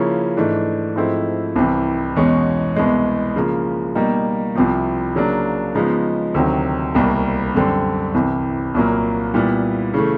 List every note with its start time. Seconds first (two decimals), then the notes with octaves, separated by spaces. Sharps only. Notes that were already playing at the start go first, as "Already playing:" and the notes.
Already playing: C#3 F3 A#3 C#4 E4
0.37 G#2 E3 A3 D4
0.96 G#2 F3 A3 C4 E4
1.56 C2 C3 E3
2.16 E2 B2 G#3 C#4
2.76 C2 B2 G#3 B3
3.36 C#3 F3 A#3
3.95 B2 G3 A#3 D#4
4.55 C2 C3 F3
5.15 C#3 F#3 A#3 D4
5.75 C#3 F3 G#3 B3 D#4
6.34 D2 C3 D#3 F#3
6.94 C2 B2 G3 A#3
7.55 F#2 D3 G3 C4
8.14 C2 C3 E3
8.74 C2 A#2 F#3 A#3
9.34 A#2 G3 B3 E4
9.94 C#3 E3 A3